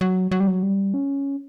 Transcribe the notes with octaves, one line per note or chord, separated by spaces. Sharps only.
F#3
F#3
G3
F#3
G3
C#4